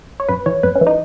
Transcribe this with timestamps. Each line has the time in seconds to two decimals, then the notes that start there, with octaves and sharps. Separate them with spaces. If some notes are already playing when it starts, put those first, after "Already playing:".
0.20 C#5
0.29 F#2 B4
0.46 E3 C#5
0.63 F#2 B4
0.75 C#4
0.81 E3
0.87 D#4